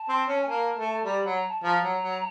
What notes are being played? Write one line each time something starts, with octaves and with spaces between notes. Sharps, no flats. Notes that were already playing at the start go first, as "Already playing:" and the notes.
Already playing: A5
C4
C#4
G#5
A#3 A5
A3
G3 A#5
B5
F#3
A#5
A5
F3 A#5
F#3
F#3